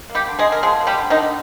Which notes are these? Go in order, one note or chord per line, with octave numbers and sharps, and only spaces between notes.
A#3
G3 G4
D3
G#3 G#4
D3
A#4
F3 G#3 G#4
A#3
G3 G4
D3
D#3 D#4
D3